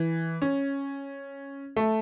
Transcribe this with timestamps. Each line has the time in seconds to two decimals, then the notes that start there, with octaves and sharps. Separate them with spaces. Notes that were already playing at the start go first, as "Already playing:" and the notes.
Already playing: E3
0.42 C#4
1.77 A3